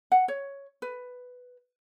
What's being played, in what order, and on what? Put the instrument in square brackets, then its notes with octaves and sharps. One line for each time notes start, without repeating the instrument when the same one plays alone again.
[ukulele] F#5
C#5
B4